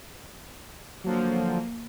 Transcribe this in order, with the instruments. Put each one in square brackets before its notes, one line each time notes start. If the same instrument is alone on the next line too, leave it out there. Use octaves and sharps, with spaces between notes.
[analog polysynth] D3 F3 F#3 [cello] A#3